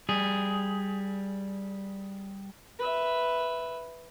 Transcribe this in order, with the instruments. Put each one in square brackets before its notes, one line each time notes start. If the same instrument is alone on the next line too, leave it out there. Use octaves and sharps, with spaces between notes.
[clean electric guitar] G3 G#4
[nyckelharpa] B4 E5